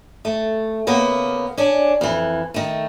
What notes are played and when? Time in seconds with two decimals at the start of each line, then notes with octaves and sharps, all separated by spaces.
0.25 A3
0.87 C#3 A#3 B3
1.58 C#4 D4
2.01 F2 E3
2.54 D#3 A3